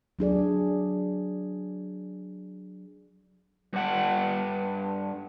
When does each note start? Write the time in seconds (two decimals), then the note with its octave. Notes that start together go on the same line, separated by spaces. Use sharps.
0.19 F#3 D4 G#4 D5
3.73 G2 F#5